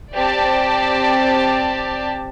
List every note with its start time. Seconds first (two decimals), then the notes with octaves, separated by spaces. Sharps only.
0.14 C4 G4 D5 A5